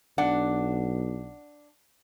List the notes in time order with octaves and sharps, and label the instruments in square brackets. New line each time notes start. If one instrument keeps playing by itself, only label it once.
[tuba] B1 [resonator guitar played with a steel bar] D4 F#5